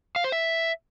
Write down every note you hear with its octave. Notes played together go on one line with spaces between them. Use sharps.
F5
C5
E5